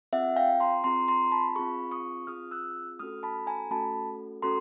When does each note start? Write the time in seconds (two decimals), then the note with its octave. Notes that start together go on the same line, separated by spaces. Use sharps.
0.13 C4 F4 G#4 E5 F#5
0.36 F5 G5
0.60 A#5 C6
0.84 C4 F4 G#4 A#5 C6
1.08 A#5 C6
1.32 A5 B5
1.56 C4 F4 G#4 B5 C#6
1.92 C#6 D#6
2.27 C4 F4 G#4 D#6 F6
2.51 E6 F#6
2.99 A3 C#4 F#4 A4 D#6 F6
3.23 A5 B5
3.47 G#5 A#5
3.71 A3 C#4 F#4 A4 A5 B5
4.42 A3 C#4 F#4 A4 A#5 C6